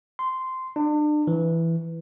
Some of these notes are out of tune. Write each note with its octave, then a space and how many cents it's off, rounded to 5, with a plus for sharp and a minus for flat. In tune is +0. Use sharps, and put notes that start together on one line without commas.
C6 -10
D4 +35
E3 +5